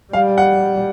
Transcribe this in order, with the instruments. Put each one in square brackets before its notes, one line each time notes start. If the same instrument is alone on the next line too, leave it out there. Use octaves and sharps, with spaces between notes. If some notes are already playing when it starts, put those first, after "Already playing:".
[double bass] G3 [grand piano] F5
[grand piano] F#5